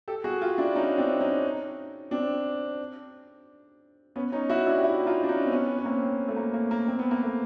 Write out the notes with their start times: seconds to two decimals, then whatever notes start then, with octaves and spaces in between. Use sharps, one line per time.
0.08 G4 A4
0.24 F#4 G#4
0.41 F4 G4
0.58 D4 E4
0.76 C#4 D#4
0.98 C4 D4
1.21 C#4 D#4
2.11 C4 D4
4.16 B3 C#4
4.32 C#4 D#4
4.50 E4 F#4
4.67 D4 E4
4.78 G4
4.83 E4 F#4
5.06 D#4 F4
5.23 D4
5.29 C#4 D#4
5.46 C4
5.51 B3 C#4
5.78 C#4
5.85 A#3 C4
6.28 A3
6.36 A#3
6.54 A#3
6.71 A#3
6.88 C4
6.99 B3
7.11 A#3
7.22 A3 B3